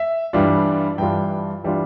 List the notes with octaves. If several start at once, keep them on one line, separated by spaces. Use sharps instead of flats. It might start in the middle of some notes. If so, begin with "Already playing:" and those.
Already playing: E5
G2 E3 G3 D4 F4
G2 E3 G3 D4 F4 G5
E3 G3 D4 F4